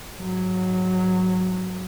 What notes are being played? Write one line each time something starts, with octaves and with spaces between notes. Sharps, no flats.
G#2 F#3